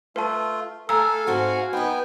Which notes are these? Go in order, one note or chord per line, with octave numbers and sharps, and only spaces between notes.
A3 F4 B4 A5
A3 A4 F5 G#5 A#5 E6
G#2 C4 F#4 F#5
B3 D#4 B4 C5 G5 G#5